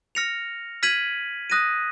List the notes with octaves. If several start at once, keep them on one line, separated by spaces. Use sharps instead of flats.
F6 A#6 C#7 F7
F6 G#6 B6 D#7 F#7
D#6 F#6 A#6 D#7